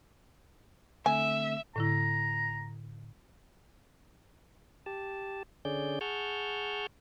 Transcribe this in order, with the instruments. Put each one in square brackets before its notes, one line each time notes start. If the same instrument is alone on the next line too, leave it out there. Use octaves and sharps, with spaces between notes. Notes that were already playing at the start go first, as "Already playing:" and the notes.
[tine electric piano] D3 A3 C4 [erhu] E5 [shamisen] G#5
[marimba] A2 D3 E4 [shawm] A#5
[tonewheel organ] G4 A5
D3 C#4 G#4 D5 G6
G#4 F#5 A5 C#6 F6 G6